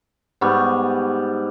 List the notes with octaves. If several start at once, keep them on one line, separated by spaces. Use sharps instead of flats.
G#2 G3 B3 C#6